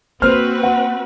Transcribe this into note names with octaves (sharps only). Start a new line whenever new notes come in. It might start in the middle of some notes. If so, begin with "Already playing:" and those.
A#3 C4 F#4 B4 C5 F6
F#5